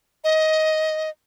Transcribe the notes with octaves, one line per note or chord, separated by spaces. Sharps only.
D#5